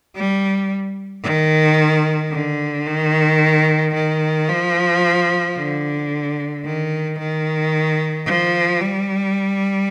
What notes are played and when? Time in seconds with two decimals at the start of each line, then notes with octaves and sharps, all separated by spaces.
0.16 G3
1.23 D#3
2.32 D3
2.87 D#3
3.94 D#3
4.48 F3
5.57 D3
6.65 D#3
7.19 D#3
8.27 F3
8.81 G3